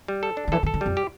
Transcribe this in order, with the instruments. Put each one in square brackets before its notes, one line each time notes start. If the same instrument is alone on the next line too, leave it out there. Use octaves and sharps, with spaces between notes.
[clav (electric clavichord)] G3
A4
D4
[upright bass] D3
[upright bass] E3 [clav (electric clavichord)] A4
[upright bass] D3
[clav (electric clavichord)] A4
[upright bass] D3
[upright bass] F2 [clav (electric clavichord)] G3
[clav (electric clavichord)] G4